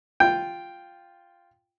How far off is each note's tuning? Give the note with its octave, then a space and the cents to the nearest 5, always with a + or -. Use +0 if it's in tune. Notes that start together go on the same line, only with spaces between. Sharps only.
F4 +0 G5 +0